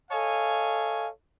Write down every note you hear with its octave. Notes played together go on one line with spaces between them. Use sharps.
A4 C#5 D#5 F5 G#5